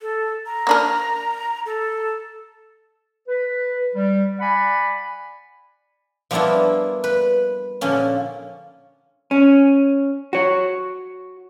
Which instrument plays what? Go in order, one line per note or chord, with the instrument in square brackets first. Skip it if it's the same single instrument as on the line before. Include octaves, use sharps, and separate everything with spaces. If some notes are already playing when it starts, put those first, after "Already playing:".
[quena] A4
A#5
[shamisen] A#3 D4 A#4
[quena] A4
[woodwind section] B4
G3
D5 F#5 G#5 B5
[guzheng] F3 G3 A#3 B3 D4 E4
B4
A#2 D3 F3 A#3 C#4
[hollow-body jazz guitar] C#4
F#4 C#5